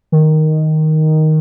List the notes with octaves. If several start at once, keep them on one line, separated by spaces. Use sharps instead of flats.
D#3